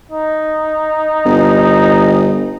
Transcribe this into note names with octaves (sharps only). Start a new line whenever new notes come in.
D#4
G1